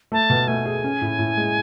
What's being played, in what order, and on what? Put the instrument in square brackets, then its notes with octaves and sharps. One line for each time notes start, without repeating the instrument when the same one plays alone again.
[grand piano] A3 [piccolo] A5
[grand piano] B2
[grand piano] A3 [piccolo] G#5
[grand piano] G#4
C#4
A2
A2
G#3